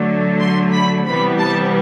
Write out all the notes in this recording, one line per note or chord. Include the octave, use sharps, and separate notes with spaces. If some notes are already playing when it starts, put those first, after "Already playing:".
Already playing: D3 F#3 A3
C6
B5
C3 E3 G3 B3 B5
A5